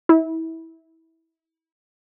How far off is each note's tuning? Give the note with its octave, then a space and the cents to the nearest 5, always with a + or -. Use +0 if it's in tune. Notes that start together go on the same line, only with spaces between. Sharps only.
E4 -25